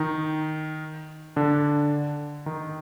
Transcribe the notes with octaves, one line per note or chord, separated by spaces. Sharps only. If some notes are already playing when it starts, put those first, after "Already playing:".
Already playing: D#3 D#4
D3 D4
D#3 D#4